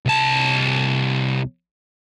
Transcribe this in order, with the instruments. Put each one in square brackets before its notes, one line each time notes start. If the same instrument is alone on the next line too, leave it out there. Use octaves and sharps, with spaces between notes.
[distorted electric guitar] C2 A5